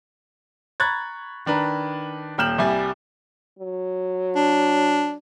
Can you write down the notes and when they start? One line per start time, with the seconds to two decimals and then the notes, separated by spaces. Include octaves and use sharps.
0.80 A#5 B5 C#6 F#6 G#6 A6
1.46 D#3 D4 B4 A#5
2.38 D#1 G5 F6 G6 E7 F#7
2.58 C2 G3 G#5
3.59 F#3
4.35 D4